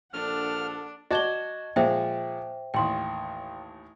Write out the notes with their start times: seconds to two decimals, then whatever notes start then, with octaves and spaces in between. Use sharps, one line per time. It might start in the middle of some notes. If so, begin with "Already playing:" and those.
0.14 A#1 D4 A4 F#5 F6
1.11 F#4 D5 D#5 A5 G#6 G7
1.76 A#2 F3 G#3 C5 E5 G5
2.74 A1 D#2 G5 C6